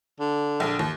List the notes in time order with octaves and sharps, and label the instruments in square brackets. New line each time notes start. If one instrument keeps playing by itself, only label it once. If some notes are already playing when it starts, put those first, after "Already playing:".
[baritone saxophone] D3
[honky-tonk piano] A#1
D#2